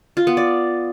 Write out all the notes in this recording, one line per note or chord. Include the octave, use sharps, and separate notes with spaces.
F4
B3
D5